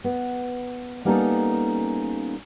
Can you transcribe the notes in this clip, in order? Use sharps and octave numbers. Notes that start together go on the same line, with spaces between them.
B3
G3 A#3 B3 C#4 D#4 A4